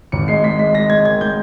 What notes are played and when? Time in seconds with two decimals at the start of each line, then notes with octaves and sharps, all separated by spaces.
0.12 G#1 C#7
0.28 G#3 C7
0.44 G#3 B6
0.59 G#3 B6
0.75 G#3 A#6
0.90 G#3 G#6
1.05 D#3 G#6
1.21 G#3 G6